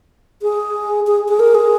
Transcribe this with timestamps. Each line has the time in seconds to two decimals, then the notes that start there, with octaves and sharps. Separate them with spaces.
0.42 G#4
1.07 G#4
1.28 G#4
1.40 A#4
1.55 G#4